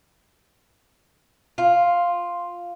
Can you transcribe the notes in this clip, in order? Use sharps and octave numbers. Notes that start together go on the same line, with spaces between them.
F4